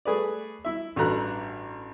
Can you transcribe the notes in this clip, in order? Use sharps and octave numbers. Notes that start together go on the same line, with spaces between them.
A3 G#4 B4 D5
E4 E5
A1 G2 F#4 A4 A#5 F#6